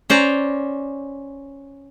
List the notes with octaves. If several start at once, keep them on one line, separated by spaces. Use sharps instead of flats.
C#4 C5 D5 A#5